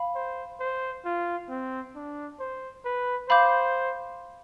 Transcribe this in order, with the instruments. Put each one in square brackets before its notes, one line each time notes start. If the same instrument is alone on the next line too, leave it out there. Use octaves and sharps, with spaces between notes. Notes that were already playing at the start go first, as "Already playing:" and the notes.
Already playing: [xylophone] F5 B5
[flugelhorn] C5
C5
F4
C4
D4
C5
B4
[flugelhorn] C5 [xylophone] F5 B5 D6 G6